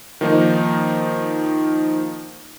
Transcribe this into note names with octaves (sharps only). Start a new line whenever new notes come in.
D#3 F3 A#3 D#4